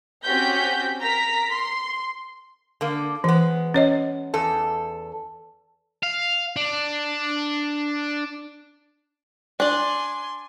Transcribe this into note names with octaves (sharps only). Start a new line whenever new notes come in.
C4 C#4 F#4 G4 G6 B6
A#4 A#5 B6
C6
D3 A#3
E3 G#3 B3
C#4 C#5 D#5
E2 A4
F5
D4
D4 D5 G#5 C6